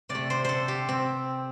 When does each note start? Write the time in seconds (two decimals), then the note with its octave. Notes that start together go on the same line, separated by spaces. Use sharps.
0.09 C3 D5
0.15 A3
0.30 C5
0.45 A4 C5
0.68 G4
0.89 C4